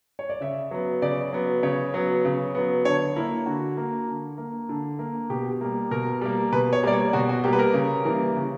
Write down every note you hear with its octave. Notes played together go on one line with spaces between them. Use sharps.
C#5
D5
C#3 E5
F#3 B3
C#3 D5
F#3 B3
C#3 C#5
F#3 B3
C#3
F#3 B3
D3 C#5
A#3 E4
D3 F#4
A#3
D3
A#3
D3
A#3
B2 G4
G3 A#3
B2 A#4
G3 A#3
B2 B4
C#5
G3 A#3 D5
C#5
B2 F#4
F#4
G3 A#3 G4
B4
A#4
C#3
E3 G3 A#3
C#3